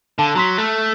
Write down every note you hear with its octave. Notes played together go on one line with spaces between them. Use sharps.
D3 F5 A5
F#3 A#5 C6 B6
A3 F#6